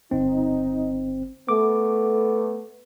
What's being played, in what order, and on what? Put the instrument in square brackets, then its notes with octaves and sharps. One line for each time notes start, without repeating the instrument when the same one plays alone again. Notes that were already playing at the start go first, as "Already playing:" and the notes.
[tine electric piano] G1 C4 [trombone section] D#4
[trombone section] A3 B3 [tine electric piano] D6